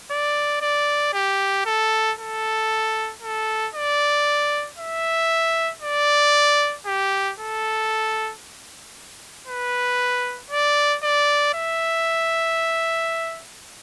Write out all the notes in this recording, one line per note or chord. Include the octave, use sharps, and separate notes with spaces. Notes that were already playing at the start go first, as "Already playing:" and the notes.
D5
D5
G4
A4
A4
A4
D5
E5
D5
G4
A4
B4
D5
D5
E5